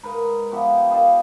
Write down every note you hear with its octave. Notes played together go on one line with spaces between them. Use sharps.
G#2 A#4 B4
F3 B3 G4 E5
B4 D#5 F5 A5